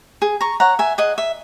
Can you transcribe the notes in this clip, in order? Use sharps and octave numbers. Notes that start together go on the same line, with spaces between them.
G#4
A#5 C#6
C#5 F#5 A#5
E5 G#5
G#4 D#5 F#5
E5